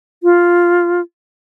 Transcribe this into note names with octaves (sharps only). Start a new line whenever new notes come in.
F4